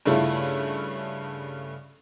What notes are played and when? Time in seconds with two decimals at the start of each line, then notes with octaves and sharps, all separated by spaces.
0.06 G2 C#3 A3 E4 F4